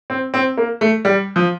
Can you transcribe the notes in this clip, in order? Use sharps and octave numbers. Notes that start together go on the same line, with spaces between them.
C4
C4
A#3
A3
G3
F3